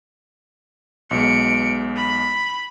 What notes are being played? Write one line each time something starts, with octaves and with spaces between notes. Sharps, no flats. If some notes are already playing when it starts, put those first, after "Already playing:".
B1 B2 G#3 C#7 D7
B5